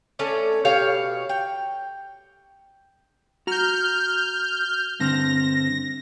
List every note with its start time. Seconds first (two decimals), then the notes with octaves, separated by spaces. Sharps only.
0.19 A3 C#4 C#5 D5
0.65 B2 G4 C#5 F5
1.29 G5
3.47 F#4 A#5 F6 G6
5.00 G2 D3 C4 A#6